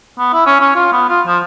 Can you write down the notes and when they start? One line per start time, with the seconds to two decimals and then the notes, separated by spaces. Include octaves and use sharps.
0.19 B3
0.33 E4
0.46 C#4
0.61 C#4
0.75 F4
0.92 B3
1.09 F4
1.26 F3